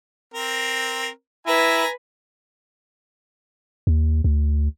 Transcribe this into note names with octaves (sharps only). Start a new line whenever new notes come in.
C4 A#4
E4 B4 G#5 A#5
D#2
D2